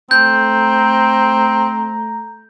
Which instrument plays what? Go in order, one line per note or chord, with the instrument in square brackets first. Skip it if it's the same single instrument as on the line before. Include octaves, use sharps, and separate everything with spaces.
[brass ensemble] A3 A#5 [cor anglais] C4 [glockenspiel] G6